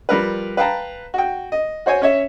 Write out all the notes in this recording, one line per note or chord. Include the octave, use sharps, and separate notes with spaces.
F3 G3 A#4 B4
B4 F5 G5 A5 A#5
F#4 G5
D#5
F#4 C5 C#5 G#5
C#4 C#5 E5